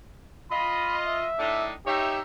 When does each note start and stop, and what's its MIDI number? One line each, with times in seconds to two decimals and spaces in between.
0.51 1.27 65
0.51 1.27 75
0.51 0.97 83
1.06 1.66 76
1.38 1.72 45
1.38 1.72 62
1.38 1.72 63
1.86 2.20 63
1.86 2.20 67
1.86 2.20 73
1.86 2.20 76